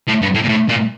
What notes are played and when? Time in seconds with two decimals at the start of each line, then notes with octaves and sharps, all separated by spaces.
0.08 A2
0.22 G2
0.35 A2
0.44 A#2
0.49 A2
0.69 A#2